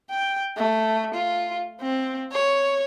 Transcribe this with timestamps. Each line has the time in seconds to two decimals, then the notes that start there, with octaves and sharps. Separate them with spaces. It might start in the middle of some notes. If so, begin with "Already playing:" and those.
0.10 G5
0.57 A3
1.14 F4
1.81 C4
2.32 C#5